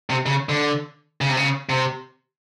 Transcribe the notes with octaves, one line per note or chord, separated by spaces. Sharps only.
C3
C#3
D3
C#3
C3
C#3
C3